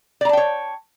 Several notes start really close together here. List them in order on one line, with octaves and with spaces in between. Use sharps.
D5 A#5 A5 G5 C#5